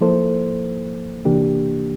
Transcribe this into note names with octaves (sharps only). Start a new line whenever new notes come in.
F3 A#3 E4 A4 C5
C3 E3 A#3 D4 G4